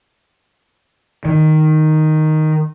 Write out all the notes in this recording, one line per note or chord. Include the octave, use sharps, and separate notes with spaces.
D#3